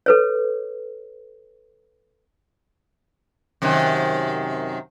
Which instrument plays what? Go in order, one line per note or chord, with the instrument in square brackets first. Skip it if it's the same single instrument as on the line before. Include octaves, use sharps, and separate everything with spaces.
[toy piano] A4 B4 C#5
[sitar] F#2 C3 D#3